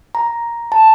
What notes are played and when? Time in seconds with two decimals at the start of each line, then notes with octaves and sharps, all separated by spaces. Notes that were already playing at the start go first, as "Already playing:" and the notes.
0.15 A#5
0.72 A5